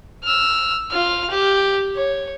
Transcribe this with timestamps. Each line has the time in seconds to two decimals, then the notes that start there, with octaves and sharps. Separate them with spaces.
0.24 E6 F6
0.91 F4 F6
1.31 G4
1.96 C#5